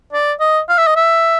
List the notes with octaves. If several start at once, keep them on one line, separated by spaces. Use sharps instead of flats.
D5
D#5
F5
E5
D#5
E5